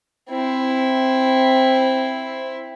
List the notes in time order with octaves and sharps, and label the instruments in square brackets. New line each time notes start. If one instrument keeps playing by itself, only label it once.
[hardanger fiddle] C4 E4